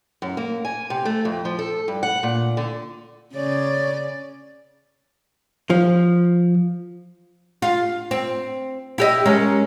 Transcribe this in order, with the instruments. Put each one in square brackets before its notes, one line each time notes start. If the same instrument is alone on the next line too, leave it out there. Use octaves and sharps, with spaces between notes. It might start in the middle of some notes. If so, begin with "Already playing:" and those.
[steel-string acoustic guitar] F#2
A#3
G#5
C3
A3
F2
F3
A4
G2
F#5
A#2
D3
[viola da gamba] C#3 D5 [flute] C#5
[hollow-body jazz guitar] F3
[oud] F4
C4
E4 G4 D#5
G#3 C#4 A#4